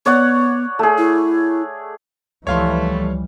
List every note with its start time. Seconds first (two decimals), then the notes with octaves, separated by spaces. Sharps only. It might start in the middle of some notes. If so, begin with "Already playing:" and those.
0.06 B3 C#5 D5 F#5
0.79 A3 G#4
0.98 E4
2.47 C#2 E3 F3 G3 A3 C#5 F5 C6